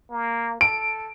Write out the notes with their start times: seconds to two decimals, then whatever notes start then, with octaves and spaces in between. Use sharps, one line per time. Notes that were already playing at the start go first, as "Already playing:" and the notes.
0.11 A#3
0.61 A4 D7